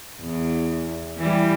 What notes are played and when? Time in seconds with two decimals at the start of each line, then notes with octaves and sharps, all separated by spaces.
0.21 E2
1.17 E3 G3